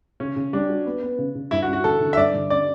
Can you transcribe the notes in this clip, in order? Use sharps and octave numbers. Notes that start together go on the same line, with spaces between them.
C#3 C#4
C#3
G3 D4
F#4
B3
B3
C#3
C#3
G2 E4
F#4
C#4
F#4
D3 A4
D3
E5
G2 D5
D3
C#4 D5